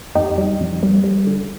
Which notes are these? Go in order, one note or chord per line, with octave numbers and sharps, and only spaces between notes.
F2 D#4 G4
G3
F2
G3
G3
D3